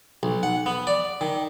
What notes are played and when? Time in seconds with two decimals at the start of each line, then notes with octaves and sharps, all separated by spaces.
0.23 B1
0.43 F#5
0.66 B3
0.87 D5
1.21 D#3